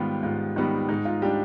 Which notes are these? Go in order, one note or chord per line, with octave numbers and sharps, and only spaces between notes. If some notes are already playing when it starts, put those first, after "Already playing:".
Already playing: G#2 D#3 G3 B3 F4 G4
G#2 F4
D#3 G3 B3 D#4
G#2 D#4
F4
G3 D4 G4